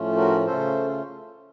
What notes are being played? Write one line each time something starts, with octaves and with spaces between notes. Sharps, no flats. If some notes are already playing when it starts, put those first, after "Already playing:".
Already playing: A2 F3 A3 C#4 F4
F#4 A#4
C#3 A3 C#4 F4 A4 C5